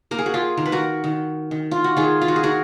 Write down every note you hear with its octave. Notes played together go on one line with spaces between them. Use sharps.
A#3 A#4
G#4
F#4
F4 G#4
D#3 A#4
B4
F#4 A#4
D#3
D#3
F4
F#4
D#3 F4 G#4
F4
F#4
G#4
D#3 F#4 A#4